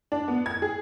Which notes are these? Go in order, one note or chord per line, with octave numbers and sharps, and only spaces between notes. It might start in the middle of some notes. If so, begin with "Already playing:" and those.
D4
B3
G#6
G#4